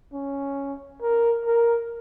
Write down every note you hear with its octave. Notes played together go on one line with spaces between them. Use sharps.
C#4
A#4
A#4